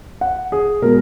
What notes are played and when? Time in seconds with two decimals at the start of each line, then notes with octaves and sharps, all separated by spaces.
0.21 F#5
0.52 G#4
0.82 B2 G#3 B3 A#4